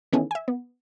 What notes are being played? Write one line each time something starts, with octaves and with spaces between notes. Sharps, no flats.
D#3 E3 B3 C#4 G#4 A4
E5 G#5
B3